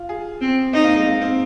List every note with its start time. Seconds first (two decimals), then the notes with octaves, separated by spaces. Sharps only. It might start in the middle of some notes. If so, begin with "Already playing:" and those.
Already playing: F4
0.09 G#4
0.41 C4
0.73 C4 D#4
0.84 A#3
0.96 G#3
1.06 A#3
1.22 C4